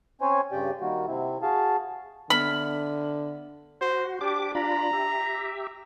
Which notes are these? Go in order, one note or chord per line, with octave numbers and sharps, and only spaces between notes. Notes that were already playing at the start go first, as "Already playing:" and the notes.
C4 C#4 C5 C#5 G#5
G2 C#3 G4 D5 G5
D#3 G3 A#3 F#4
C3 C4 E4
F#4 G#4 F5 A5
D3 B3 E5 B5 F6
F#4 C5
D4 G4 D6
D4 F4 A#5 B5
G4 E5